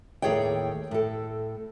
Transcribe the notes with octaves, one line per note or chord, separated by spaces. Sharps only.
D#2 A2 G#4 C#5 D5 G5
A2 A4